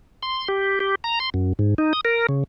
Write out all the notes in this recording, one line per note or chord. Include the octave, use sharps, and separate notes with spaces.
C6
G4
G4
A#5
C6
F#2
G#2
D#4
D#6
A#4
C#3